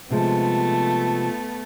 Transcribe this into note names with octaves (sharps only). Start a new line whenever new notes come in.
C3 F3 G#3 A3 B3